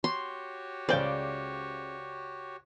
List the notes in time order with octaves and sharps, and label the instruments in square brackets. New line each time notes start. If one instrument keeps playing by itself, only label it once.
[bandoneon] F#4 G4 C#5 [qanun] C6
[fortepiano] C#2 C5 [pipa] C#3 G5 [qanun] D5